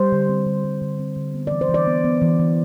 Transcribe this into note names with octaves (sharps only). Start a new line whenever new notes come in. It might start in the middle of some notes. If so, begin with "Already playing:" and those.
Already playing: G3 C5
D3
C4
D3
G3
D3
C4
D3
B3
E3 D5
C5
E3
D5
B3
B3
E3
E3